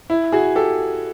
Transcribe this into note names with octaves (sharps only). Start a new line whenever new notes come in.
E4
F#4 G#4
G4 A4